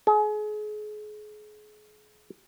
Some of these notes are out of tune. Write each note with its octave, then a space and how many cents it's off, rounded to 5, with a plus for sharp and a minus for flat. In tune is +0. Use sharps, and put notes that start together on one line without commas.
G#4 +35